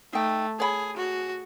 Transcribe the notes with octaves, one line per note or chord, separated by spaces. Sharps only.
A3 D#4 G5
G#4 C#5 B5
F#4